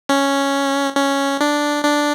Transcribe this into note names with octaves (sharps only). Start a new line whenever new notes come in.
C#4
C#4
D4
D4